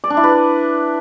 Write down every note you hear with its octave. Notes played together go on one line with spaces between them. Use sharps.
D5
D4
E4
B4